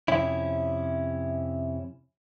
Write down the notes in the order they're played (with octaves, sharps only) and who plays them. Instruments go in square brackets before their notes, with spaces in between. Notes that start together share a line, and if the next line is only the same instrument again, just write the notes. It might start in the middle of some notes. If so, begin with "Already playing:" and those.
[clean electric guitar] F2 C3 C#4 E4